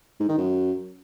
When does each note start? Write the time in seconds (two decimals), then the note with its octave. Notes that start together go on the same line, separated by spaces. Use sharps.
0.20 G#2
0.29 D#3
0.38 F#2